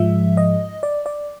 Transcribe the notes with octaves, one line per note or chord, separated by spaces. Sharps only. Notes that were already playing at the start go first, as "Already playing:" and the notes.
Already playing: G#2 F3 G#3 E5
D#5
D5
D5